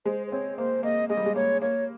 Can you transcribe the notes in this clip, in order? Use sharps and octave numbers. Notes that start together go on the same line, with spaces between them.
G#3 C5
C5
C4 C#5
A#3 C5
A#3 D#5
G#3 D#5
G3
G#3
A#3 C#5
A#3 C#5